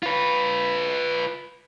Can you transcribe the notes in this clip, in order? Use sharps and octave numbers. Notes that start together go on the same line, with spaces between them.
F4 B4